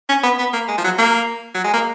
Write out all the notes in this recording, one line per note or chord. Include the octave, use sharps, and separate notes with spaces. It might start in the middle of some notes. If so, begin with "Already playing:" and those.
C#4
B3
B3
A#3
G#3
F3
F#3
A#3
F#3
G#3
A#3